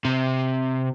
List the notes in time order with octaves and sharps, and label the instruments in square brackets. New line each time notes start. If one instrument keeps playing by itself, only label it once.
[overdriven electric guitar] C3